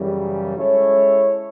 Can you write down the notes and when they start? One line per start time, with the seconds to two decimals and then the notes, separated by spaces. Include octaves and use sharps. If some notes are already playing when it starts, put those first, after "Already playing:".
Already playing: F#2 C#3 E3 G3
0.57 G#3 C#4 E4 A4 C#5